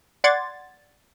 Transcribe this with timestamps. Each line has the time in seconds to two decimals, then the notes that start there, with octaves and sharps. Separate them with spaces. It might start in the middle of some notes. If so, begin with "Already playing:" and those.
0.24 D5 F#5 C6 G#6 A6